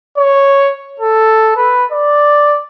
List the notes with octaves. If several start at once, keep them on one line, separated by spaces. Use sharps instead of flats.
C#5
A4
B4
D5